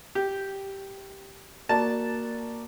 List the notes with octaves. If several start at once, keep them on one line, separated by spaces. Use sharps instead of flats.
G4
A#3 F#4 D5 A5